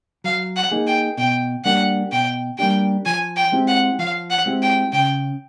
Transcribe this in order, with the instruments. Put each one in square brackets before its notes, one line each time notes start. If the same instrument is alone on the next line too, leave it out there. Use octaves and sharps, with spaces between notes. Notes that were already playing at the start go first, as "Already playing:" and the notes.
[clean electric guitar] F#3 [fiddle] F5
[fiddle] F#5
[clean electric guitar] A#3 D#4 G#4
[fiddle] G5
[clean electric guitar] B2 [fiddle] G5
[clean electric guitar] G3 A#3 D4 G4 [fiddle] F#5
[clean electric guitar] B2 [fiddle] G5
[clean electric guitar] G3 A#3 D4 G4 [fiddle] G5
[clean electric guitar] F3 [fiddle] G#5
[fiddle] G5
[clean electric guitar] G#3 C4 E4 G4
[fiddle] F#5
[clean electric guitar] F3 [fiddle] F5
[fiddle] F#5
[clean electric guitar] G#3 C4 E4 G4
[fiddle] G5
[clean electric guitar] C#3 [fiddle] G5